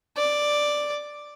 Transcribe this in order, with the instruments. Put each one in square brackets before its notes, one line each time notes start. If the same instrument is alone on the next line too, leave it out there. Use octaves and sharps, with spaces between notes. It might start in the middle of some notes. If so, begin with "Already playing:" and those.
[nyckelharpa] D5